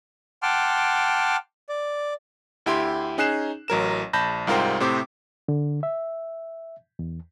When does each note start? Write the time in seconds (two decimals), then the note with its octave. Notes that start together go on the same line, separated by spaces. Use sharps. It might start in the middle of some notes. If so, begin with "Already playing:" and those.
0.43 F#5 G5 A5 C6 D6 F6
1.69 D5
2.66 D2 E4 G4 G5 C6
3.18 C#4 D#4 G#4 F#6 C7 E7
3.68 A1 F#3 A#4 E7
4.13 A#1 A5 B5 G6 A#6
4.47 C2 G#2 F4 A#4 C5 G5
4.80 A2 C3 C4 C5 D6
5.48 D3
5.83 E5
6.99 E2